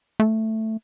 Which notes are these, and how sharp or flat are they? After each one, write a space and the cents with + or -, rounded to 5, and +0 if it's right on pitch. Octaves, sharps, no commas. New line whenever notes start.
A3 +5